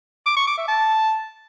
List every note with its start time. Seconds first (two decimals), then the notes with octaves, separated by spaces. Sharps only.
0.26 D6
0.36 C#6
0.47 D6
0.58 E5
0.68 A5